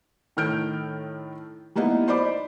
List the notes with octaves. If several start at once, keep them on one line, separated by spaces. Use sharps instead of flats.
A2 D#3 A4 F6 G6 D7
G3 A#3 B3 D#4 E4
D#4 C5 D5 B5 D6